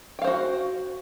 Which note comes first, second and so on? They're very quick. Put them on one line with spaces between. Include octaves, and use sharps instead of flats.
G5 F5 C5 F#4